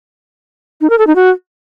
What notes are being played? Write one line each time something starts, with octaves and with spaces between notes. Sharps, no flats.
D#4
A#4
A4
D#4
F#4